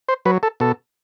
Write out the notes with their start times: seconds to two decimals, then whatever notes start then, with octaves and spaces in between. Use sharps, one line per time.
0.09 C5
0.25 F#3 B4
0.43 A4
0.60 B2 A4